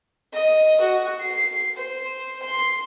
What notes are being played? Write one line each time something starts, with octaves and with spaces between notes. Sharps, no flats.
D#5
F#4
C7
C5
C6